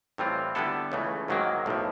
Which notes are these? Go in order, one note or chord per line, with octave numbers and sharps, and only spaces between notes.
A2 E3 G3 C4 F4
D3 G3 B3 E4 A4
C#2 C#3 E3 A3
G#2 D#3 F#3 A#3
B1 A2 F3